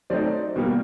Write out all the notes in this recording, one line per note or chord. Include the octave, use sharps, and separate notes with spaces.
F#3 A3 C4 D#4 C5 D5
B2 G3 A#3